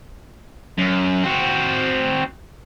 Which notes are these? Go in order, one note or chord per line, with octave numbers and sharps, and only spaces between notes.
F#2
C4 F#4